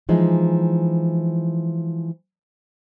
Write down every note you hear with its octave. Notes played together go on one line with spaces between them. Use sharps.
E3 F3 G#3 D#4